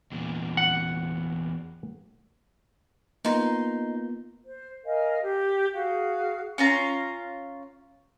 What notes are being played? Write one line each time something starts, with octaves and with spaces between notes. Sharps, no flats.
E2 A#2
F#5
A#3 B3 D#4 F4 C6
C5
A#4 D#5 F5 G#5
G4
F#4 G#4 F5
C#4 F4 A#5